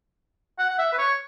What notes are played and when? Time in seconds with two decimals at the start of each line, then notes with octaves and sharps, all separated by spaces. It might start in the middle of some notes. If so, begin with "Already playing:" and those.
0.59 F#5
0.69 F#5
0.78 E5
0.93 B4
0.98 C#5